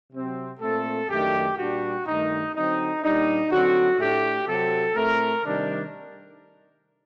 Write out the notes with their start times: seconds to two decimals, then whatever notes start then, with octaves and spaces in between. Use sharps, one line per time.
0.12 C3 F#3 C4
0.60 A#2 A3 C4 A4
1.09 F#2 D#3 A3 D4 G4
1.56 A#2 G3 D4 F#4
2.05 G2 D#3 A3 D#4
2.54 D3 F#3 C4 D#4
3.02 A#2 G3 D4 D#4
3.50 D3 F#3 C4 F#4
3.99 A2 A3 D4 G4
4.46 C3 F#3 C4 A4
4.95 A2 A3 C4 A#4
5.44 C3 D#3 G3 D4